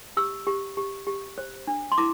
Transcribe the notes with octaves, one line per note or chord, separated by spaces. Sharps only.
G4 E6
G4
G4
G4
C5
D4
C6
E4 D6